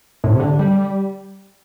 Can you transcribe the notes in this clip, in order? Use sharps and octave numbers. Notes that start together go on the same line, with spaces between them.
A2
C3
D3
G3